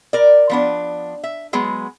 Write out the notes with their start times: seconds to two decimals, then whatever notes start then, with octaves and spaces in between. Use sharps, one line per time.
0.13 A#4 D5
0.49 F3 B3 D4
1.24 E5
1.53 F#3 G#3 B3